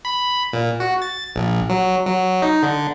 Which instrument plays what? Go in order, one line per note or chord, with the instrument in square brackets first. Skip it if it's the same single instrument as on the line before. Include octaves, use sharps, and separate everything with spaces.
[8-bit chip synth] B5
A#2
F#4
A6
A#1
F#3
F#3
D#4
D3